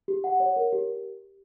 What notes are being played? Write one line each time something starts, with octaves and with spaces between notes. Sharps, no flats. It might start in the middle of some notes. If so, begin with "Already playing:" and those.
G4
F#5
C#5
A#4
G4